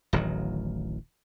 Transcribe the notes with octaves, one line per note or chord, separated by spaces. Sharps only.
D1 A1 D#3 F#3